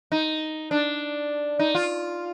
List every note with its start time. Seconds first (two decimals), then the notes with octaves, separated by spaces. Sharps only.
0.12 D#4
0.71 D4
1.59 D#4
1.75 F4